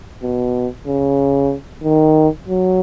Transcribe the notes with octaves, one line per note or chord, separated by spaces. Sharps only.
B2
C#3
D#3
F#3